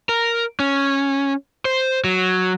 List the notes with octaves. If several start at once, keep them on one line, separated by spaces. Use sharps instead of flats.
A#4
C#4
C5
F#3